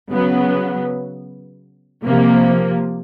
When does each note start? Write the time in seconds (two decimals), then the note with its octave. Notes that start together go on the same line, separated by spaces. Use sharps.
0.10 C#3 F#3 B3
2.03 C3 F3 A#3